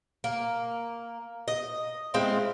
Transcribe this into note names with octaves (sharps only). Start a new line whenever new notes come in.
A#3
D#5
G#3 C4 E4 F4